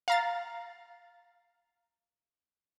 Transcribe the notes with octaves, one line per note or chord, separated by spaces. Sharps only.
F5 A#5 A6